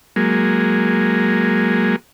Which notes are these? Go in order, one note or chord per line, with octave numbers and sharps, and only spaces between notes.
F#3 G#3 A#3